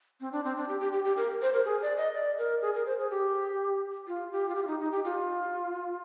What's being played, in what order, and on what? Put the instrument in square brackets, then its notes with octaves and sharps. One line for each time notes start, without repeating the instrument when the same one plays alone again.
[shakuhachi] C4
D4
C4
D4
G4
G4
G4
G4
A#4
C5
A#4
G#4
D5
D#5
D5
A#4
G#4
A#4
C5
G#4
G4
F4
G4
F4
G4
F4
D#4
D#4
G4
F4